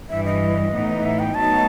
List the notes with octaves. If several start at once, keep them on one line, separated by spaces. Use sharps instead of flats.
G2 E3 G3 E5
D#5
A2 E3 B3 D#4
E5
G5
B2 F#3 A3 D#4 A5